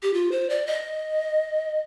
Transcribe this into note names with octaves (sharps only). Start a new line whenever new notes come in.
G4
F4
C5
D5
D#5